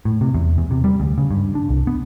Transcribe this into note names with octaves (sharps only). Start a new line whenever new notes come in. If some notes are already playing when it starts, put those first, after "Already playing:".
A2
C3
E2
E2
C3
G3
D2
C#3
G2
D4
C2
B3